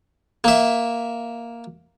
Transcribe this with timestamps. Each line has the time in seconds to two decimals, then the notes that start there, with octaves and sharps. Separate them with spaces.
0.44 A#3 E5